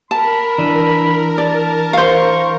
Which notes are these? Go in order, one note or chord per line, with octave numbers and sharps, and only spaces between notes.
A#4 A5 B5
E3 D4
D5 A5
C5 F5 C#6